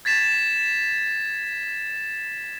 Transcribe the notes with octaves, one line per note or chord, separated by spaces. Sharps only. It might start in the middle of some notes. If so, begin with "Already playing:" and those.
G#6 A6 B6 E7